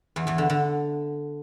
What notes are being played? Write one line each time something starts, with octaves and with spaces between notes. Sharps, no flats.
E2 E3
E2 E3
D3
D3